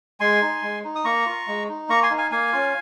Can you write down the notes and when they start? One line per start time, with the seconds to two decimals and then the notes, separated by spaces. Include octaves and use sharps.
0.20 G#3 G#5 C6
0.42 D#4
0.62 G#3
0.84 D#4
0.95 D#6
1.04 A#3 A#5 C#6
1.26 F4
1.47 G#3
1.69 D#4
1.89 A#3 A#5 C#6
2.03 G#5 C6
2.10 D#4
2.18 F5 G#5
2.31 A#3 F5 G#5
2.53 C#4 F4